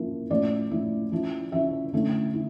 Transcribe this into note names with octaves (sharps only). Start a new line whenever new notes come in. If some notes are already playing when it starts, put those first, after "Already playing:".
Already playing: F3 A#3 C#4 E4
A2 F3 C#4 E4 D5
A2 F3 C#4 E4
F3 C#4 E4
F3 C#4 E4 E5
D3 A3 C#4 E4
E4